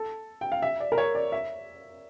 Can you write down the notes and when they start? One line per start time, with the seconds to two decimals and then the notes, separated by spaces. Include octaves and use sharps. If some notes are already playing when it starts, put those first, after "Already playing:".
Already playing: A4
0.41 G5
0.52 F5
0.62 E5
0.80 D5
0.92 A#4
0.98 C#5
1.15 D5
1.32 E5